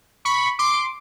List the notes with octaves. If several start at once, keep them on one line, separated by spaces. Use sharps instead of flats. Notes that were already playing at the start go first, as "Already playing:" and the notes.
B5 C#6
C6 D6